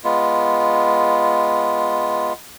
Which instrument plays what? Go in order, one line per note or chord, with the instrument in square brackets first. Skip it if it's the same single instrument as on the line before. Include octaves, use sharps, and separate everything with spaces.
[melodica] G#3 B3 F4